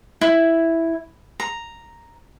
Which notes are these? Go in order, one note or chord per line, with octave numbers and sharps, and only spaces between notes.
E4
A#5